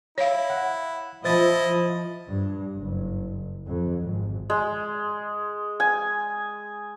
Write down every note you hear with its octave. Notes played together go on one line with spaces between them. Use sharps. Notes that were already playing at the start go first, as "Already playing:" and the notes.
E4 C#5 F5
F#5
F3 E4 C5 D#5 A6
G2
F#1
F2
G#1
G#3
G#5